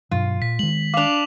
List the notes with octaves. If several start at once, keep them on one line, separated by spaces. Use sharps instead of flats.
G2 B2 F#3 F4
A#2 B6
D#3 G#3 F#7
D4 F5 D6 F7